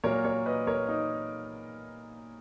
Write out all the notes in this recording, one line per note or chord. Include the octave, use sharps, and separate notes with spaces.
A#2 F#3 A#3 A#4 C#5
A#4 C#5
B4 D#5
A#4 C#5
D#4